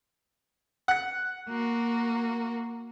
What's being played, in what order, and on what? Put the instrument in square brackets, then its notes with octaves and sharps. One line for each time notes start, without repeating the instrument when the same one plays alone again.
[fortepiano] F#5 F#6
[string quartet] A#3 F#4